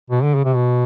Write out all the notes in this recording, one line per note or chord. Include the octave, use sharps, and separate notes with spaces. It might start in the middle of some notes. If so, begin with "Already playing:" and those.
B2
D3
C#3
C3
B2